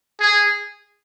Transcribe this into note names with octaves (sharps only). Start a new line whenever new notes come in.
G#4